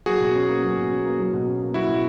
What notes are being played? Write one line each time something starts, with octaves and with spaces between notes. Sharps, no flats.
F#3 F#4 G#4
B2
C#4
A#3
F#3
B2
C#4
A#3
F#3
B2
C#4
A#3
F#3 E4 F#4
B2